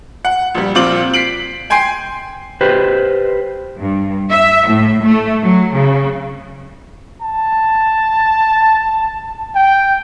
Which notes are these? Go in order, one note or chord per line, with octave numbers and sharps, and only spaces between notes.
F#5
A#1 G3
A#1 C4 F4 D6 G6 F#7
B6 C7 D7 F#7
G5 G#5 C6 G6 C7 D7
G4 B4 C5
G2
E5
A2
A3
F#3
C#3
A5
G5